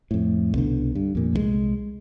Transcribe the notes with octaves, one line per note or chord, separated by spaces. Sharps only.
F2 A2
C2 B2 D3
G2
F2 A#2
C2 F3 G#3